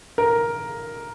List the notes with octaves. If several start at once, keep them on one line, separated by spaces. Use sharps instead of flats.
A#4